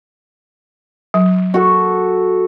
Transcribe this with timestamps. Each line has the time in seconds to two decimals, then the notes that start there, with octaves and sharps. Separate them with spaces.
1.14 F#3
1.54 F#4 A4